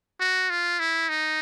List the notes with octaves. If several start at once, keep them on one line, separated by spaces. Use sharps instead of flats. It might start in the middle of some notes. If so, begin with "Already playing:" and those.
F#4
F4
E4
D#4